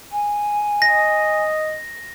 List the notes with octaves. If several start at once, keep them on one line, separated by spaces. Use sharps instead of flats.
G#5
D#5 A#6